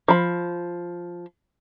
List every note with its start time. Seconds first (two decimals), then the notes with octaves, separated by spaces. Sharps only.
0.08 F3 B5